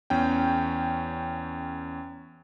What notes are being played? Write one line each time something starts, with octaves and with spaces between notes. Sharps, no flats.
E2 C#4 G5